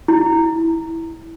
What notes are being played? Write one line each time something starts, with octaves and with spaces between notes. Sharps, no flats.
E4